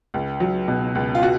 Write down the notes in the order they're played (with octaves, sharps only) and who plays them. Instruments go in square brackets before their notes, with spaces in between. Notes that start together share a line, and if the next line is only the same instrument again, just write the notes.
[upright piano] C#2
F#3
B2
C#2
F4
F#4